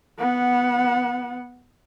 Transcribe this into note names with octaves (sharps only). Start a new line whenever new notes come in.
B3 F#5